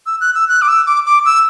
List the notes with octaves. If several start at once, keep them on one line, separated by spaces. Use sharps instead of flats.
E6
F#6
E6
F#6
D6
E6
D6
D6
E6